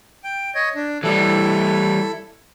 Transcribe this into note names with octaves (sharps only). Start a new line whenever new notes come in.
G5
C#5 D#5
D4
E3 G3 E4 A4